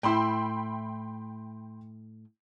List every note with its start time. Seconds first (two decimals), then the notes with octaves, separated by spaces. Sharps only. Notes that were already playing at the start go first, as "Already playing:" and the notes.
0.03 A2 E4 G5 B5 C6